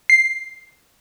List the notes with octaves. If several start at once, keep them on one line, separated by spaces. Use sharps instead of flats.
C7